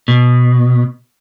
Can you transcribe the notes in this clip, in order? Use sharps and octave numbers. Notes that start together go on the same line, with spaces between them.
B2